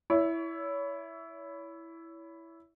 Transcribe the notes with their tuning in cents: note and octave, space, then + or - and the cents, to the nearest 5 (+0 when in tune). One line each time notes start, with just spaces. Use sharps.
E4 +0 C#5 +30